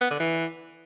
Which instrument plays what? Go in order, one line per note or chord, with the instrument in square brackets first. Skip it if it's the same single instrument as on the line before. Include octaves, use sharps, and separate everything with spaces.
[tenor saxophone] B3
D3
E3